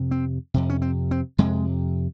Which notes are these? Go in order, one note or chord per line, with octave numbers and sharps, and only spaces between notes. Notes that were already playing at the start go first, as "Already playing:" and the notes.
Already playing: F2 C3
C4
F2 C3
C#4
C4
C4
F2 C3 G#3